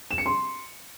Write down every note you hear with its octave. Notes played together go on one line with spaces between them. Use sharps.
E7
C#7
C6